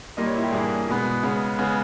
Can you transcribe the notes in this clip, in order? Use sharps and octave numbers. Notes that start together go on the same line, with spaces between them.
A#2 G3 A#3 D#5
C#5
E4
G4
G2 E3 A#3 G#4
B2 G#3 B3
C#3 G#3 B3
C#3 G#3 B3